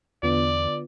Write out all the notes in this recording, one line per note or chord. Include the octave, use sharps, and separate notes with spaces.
E2 D3 B3 F4 D5